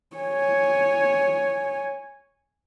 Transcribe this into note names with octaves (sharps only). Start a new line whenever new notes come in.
C#5 G#5